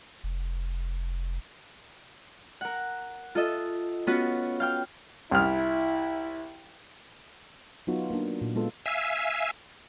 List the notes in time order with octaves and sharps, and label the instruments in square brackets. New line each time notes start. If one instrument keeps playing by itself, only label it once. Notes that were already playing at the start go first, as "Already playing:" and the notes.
[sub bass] F1
[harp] A#4 F#5
F4 A4 D#5 E5
B3 C#4 F4 F#4 B4
F5 G5 F6
[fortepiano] C2 F6 [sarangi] E4
[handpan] F#3 B3 D#4 F4 F#4
A#3 D4
A#2
G#3 B3 F4 A4
[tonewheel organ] E5 F5 G#5 E6